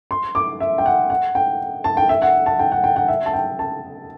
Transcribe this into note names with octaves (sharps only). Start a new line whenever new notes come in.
C6
D6
E5
G5
F#5
F#5
G5
A5
G5
E5
F#5
A5
G5
F#5
G5
F#5
E5
A5
G5
A5